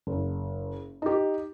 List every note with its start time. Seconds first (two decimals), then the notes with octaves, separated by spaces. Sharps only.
0.07 F#1
1.02 D#4 G4